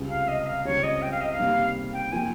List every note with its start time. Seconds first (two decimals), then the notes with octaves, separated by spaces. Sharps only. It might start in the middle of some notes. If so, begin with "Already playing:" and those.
Already playing: C#2 C3 G3
0.09 F5
0.28 D#5
0.47 F5
0.65 C#2 C#3 G3 C4 C#5
0.83 D#5
1.02 G5
1.12 F5
1.21 D#5
1.31 F5
1.38 C3 G3 A#3 D#4
1.94 G5
2.12 F3 A#3 F4 G#5